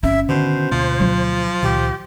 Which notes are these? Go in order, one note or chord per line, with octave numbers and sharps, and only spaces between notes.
G1 C#4 E5
B2 D3 D#3 C5
D2 B2 F3 A#3
F#3 F4
C#2 A#2 D#3 G4